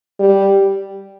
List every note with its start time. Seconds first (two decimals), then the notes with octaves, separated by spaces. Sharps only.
0.19 G3